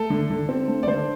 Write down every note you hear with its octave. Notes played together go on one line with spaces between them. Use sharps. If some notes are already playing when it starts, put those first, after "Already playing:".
Already playing: A3 A4
D3
D3
C4
A3
D5
D3 C5